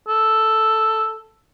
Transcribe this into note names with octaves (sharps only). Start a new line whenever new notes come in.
A4